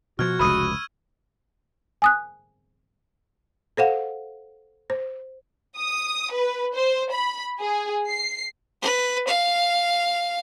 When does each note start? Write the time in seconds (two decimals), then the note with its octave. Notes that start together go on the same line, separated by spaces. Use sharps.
0.19 B2 F3 F#4 F6 G#6
0.39 F1 C#2 B5 C#6 D#6 E6 D#7
2.02 G#5 D#6 F#6
3.77 A4 C5 F5 F#5
4.90 C5
5.77 D#6
6.32 B4
6.76 C5
7.12 B5
7.60 G#4
8.08 C7
8.82 B4
9.27 F5